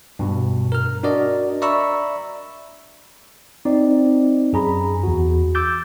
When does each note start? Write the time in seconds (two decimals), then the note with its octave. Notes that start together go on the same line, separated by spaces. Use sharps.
0.19 G2 B2
0.72 A#4 F6
1.03 D4 F#4 A#4 D5 D#5
1.62 D5 E5 A#5 B5 C#6 E6
3.65 C4 D#4 D5
4.53 F#2 G#4 A#5 B5
5.03 E2 F#4
5.55 D6 E6 G6 A6